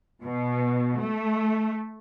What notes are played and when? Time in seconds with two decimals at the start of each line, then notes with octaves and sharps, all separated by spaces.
0.24 B2
1.02 A3